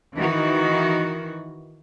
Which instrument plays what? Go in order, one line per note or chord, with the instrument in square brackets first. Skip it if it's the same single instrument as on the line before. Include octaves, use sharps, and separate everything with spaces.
[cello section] D#3 E3 F#4